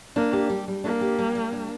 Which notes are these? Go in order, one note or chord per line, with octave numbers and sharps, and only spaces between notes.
A#3 D4
G4
G3
G3
A#3 D4
G4
G3
G3
D4